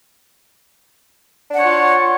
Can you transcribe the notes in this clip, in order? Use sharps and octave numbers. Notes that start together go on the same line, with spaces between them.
D4 F4 C#5 F#5